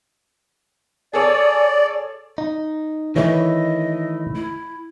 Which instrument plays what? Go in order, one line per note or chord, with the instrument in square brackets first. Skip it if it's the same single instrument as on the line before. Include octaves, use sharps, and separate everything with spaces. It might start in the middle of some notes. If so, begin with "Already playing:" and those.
[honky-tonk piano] G#4 A4 C#5 [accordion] D5
[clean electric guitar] D#4
[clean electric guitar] D#3 A3 E4 [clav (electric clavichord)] E3 C#5 [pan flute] D#5
[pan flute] E4